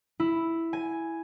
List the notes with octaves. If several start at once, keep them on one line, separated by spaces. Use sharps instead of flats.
E4
G#5